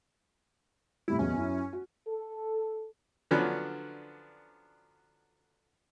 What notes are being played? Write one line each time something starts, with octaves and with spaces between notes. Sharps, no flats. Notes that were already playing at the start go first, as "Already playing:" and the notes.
A2 C3 G3 E4
B1 E2 C#4
F#2 E4
F#4
A4
D3 F3 F#3 B3 C#4 D4